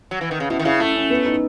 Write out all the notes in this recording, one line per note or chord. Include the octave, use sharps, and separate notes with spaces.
F#3
E3
D#3
C#3
B2 E4
D#3
C#3 E4
A3 E4
C#4
B3
D#4